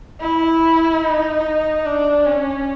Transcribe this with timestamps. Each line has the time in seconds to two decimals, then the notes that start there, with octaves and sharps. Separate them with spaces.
0.21 E4
1.03 D#4
1.86 D4
2.26 C#4